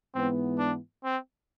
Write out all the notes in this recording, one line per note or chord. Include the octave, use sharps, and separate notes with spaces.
G#2 E3 B3 C4
D4
C4